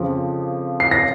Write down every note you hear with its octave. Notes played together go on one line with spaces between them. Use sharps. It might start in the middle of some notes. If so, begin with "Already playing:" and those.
Already playing: F2 C#3 F3
C7
A#6